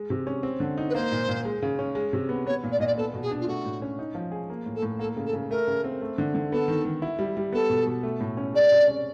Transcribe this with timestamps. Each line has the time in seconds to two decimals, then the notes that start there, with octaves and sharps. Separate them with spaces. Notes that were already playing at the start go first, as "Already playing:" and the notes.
Already playing: G#3
0.10 C3
0.27 C#4
0.43 C4
0.60 D3
0.78 D#4
0.89 B4
0.94 A#3 C5
1.12 A#2
1.29 A#2
1.45 G#3
1.62 C#3
1.79 C#4
1.95 G#3
2.13 C3
2.29 B3
2.46 B3 C#5
2.63 A#2
2.72 D5
2.80 A#2 D#5
2.87 D5
2.97 B3 A4
3.14 B2
3.22 G#4
3.31 D4
3.41 F4
3.47 A3 F#4
3.65 A2
3.82 C#4
3.99 D#4
4.15 F3
4.32 G#4
4.50 A#3
4.66 A2
4.75 A4
4.82 A2
4.99 A#3 A4
5.17 C#3
5.25 A4
5.33 C#3
5.50 A3 A#4
5.67 C#3
5.84 C4
6.01 A3
6.18 D3
6.35 D3
6.52 B3 A4
6.68 D#3
6.85 D#3
7.02 E4
7.19 G3
7.37 G3
7.52 B3 A4
7.69 B2
7.87 B2
8.03 A3
8.20 A2
8.37 C#4
8.54 G#3 D5
8.72 C3
8.88 C#4